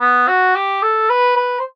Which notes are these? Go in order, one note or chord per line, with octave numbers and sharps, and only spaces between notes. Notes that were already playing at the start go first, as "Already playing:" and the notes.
B3
F#4
G4
A4
B4
B4
C5